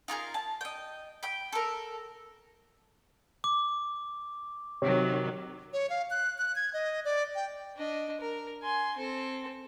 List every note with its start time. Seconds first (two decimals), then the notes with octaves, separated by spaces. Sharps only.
0.08 D#4 F4 G#4 A#4
0.34 A5
0.61 D#5 G5
1.23 G5 B5
1.52 A4 A#4
3.44 D6
4.82 C3 D#3 F#3 C#5
5.73 C#5
5.90 F5
6.10 F#6
6.38 F#6
6.56 G#6
6.74 D#5
7.05 D5
7.35 G5
7.77 D4 D#5
8.20 A#4
8.62 G#5 C6
8.97 C4 A4